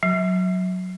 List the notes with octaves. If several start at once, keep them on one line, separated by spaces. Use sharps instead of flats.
F#3